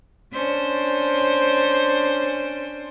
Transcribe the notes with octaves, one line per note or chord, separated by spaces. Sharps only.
C#4 D4 C5